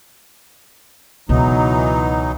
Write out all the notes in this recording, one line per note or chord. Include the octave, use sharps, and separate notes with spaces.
C#2 B2 E3 F#3 D#4